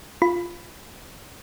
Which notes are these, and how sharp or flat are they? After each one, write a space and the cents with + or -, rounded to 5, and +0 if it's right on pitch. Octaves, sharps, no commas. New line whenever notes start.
F4 +0 B5 +0